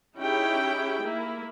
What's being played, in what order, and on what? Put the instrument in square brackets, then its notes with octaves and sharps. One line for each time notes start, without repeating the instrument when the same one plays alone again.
[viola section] C#4 D#4 E4 G4 G#4 G5
A#3 E4